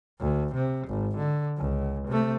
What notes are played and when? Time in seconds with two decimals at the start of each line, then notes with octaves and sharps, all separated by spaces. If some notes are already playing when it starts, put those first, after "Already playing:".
0.20 D2
0.54 C3
0.88 G#1
1.17 D3
1.58 C#2
2.08 C3 A3